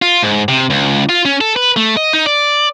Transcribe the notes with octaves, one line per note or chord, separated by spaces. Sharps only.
F4
G#2
C3
C#2
F4
C#4
A4
B4
A3
D#5
D#4
D5